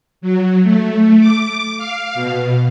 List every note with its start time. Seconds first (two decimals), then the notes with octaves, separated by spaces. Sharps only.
0.21 F#3
0.63 A3
1.20 D6
1.77 F5
2.15 B2